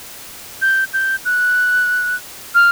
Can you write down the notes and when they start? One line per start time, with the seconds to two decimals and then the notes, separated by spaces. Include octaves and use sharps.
0.62 G6
0.93 G6
1.25 F#6
2.55 F6